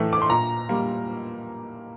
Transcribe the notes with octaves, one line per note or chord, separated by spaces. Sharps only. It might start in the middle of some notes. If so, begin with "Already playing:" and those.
Already playing: A2 E3 A3
D6
C6
A#2 A#5
G3 A#3